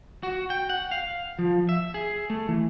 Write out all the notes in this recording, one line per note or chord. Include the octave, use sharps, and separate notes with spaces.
F#4
G5
F#5
F5
F3
E5
G#4
A3
E3